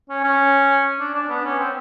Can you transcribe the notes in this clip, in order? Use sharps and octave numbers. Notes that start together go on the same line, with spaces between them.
C#4
C#4
D4
D4
B3
C#4
C4